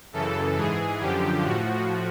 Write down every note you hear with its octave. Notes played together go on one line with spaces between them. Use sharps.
F#2 C#3 E3 A4
G#2 E3 G#4
F#2 D3 F3 G4
A2 F3 F#4